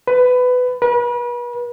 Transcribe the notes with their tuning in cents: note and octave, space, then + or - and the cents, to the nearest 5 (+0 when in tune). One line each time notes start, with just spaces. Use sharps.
B4 +15
B4 -40